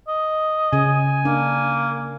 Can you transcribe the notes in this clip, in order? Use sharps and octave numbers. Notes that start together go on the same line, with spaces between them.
D#5
C#3 G#5
A#3 D4